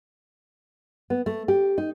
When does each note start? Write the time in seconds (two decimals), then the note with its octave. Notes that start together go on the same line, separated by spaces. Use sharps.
1.10 B3
1.26 A3
1.48 G4
1.78 D#4